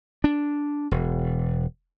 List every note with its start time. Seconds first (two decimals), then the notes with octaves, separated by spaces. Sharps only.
0.24 D4
0.91 E1